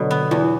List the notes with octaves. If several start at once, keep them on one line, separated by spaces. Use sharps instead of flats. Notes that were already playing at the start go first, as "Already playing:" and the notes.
Already playing: B2 D3 F#3 D4
B3
E2 E3